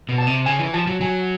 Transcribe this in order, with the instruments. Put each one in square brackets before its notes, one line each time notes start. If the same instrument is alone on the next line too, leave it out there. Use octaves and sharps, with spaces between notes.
[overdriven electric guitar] B2
[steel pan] A5
[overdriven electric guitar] C3
[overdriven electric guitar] C#3 [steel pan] G#5
[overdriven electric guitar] E3
[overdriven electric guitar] F3 [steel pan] A5
[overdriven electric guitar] F#3
[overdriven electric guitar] F#3 [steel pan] G#5